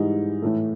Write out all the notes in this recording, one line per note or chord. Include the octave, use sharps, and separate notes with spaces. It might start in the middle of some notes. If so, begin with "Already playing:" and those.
Already playing: G#2 E3 G3 D#4
A2 E3 A3